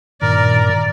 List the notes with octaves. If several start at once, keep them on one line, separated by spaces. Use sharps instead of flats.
G2 A#2 D#3 A#4 D5